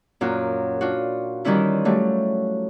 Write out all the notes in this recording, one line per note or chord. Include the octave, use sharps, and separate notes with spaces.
F#2 A#2 F4 F#4
D4 F4 F#4
D#3 E3 G3 C#4 E4 F4
F#3 G3 A3